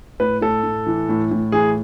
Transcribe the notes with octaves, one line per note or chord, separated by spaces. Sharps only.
A2 B4
A2 A4
A2
E3
A2
A2
E3 G#4